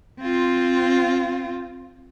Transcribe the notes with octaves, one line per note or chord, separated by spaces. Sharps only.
C4 F4